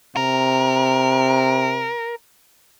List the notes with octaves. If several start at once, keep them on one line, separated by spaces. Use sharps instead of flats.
C3 A#4